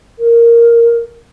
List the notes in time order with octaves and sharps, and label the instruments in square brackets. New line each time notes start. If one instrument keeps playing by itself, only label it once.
[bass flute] A#4